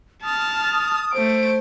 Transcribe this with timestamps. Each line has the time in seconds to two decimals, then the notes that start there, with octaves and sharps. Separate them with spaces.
0.23 A5 D#6 F6
1.13 A3 C5 D7